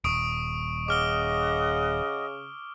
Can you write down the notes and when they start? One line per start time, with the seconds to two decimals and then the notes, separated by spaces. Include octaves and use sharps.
0.04 D#1 C#6 D#6 D7
0.88 C#3 D#5 F#5 D6 D#6 F6 G7